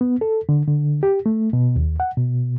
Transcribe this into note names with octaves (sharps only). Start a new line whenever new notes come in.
B3
A4
D3
D3
G4
A3
B2
D#2
F#5
B2